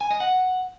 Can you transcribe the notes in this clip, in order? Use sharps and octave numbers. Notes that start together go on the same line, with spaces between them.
G#5
D#5
F#5